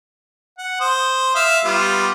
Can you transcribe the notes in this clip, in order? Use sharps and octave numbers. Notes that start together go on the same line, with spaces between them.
F#5
C5 D#6
E5 F5
G3 B3 F4